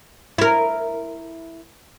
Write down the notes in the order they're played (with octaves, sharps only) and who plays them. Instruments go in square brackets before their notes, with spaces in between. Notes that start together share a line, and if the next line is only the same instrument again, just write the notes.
[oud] E4 A#4